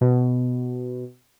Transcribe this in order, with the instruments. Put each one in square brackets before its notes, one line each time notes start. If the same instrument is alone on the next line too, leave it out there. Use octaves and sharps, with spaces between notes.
[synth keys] B2